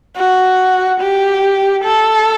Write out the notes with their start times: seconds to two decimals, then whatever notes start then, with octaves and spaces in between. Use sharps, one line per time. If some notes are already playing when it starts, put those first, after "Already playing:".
0.16 F#4
1.01 G4
1.84 A4